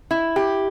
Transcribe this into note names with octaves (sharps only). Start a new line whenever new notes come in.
E4
G4